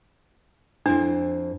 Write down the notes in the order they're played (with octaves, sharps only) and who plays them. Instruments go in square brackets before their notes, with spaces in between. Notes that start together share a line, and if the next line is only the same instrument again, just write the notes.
[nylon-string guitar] F2 E4 C5 [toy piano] D4